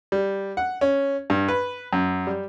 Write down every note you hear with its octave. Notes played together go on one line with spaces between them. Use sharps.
G3
F#5
C#4
G2
B4
F#2
G3